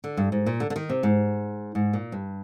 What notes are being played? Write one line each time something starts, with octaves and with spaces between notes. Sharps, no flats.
D3
G2
G#2
A#2
D3
D3
D#3
C3
G#2
G#2
A#2
G2